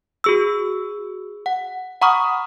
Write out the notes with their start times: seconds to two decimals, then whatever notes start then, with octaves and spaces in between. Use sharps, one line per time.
0.24 F#4 G#4 E6
1.46 F#5
2.02 F#5 A#5 B5 C#6 D#6 F6